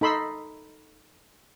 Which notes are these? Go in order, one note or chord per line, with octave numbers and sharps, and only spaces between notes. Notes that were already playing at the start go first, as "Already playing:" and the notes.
D#4 A4 B5 C6 E6